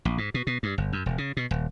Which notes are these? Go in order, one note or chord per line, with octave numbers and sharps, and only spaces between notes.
A#1
G#2
B2
B2
G2
G1
F#2
E1
C#3
B2
D#1